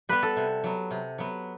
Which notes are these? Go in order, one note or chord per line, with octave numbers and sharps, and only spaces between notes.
G3 B3 B4
A4
C3
F#3 B3
C3
F#3 B3